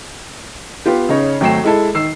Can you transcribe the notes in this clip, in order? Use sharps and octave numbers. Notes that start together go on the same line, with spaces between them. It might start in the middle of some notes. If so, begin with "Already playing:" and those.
B3 F4 G4
C#3 D#4 C#5
G#1 F#3 A3 G5 C7 E7
G#3 E4 A4
D#3 E6 C7